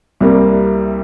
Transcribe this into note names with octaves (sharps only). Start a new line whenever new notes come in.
C2 C3 G3 A#3